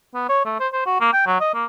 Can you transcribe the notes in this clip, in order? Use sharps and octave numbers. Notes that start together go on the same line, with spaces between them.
B3
C#5
A3
C5
C5
F#4
A#3
G5
F#3
D#5
A#3